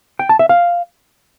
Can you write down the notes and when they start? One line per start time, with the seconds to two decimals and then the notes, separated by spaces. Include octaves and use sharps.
0.19 G5
0.29 A5
0.39 E5
0.49 F5